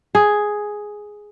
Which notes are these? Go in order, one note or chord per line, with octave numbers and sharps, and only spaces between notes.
G#4